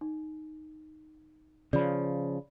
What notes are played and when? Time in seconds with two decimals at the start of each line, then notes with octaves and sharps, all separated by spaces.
0.01 D#4
1.73 C#3 F3 D5 B5